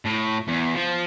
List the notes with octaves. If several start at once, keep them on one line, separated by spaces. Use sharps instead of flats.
A2
E2
F3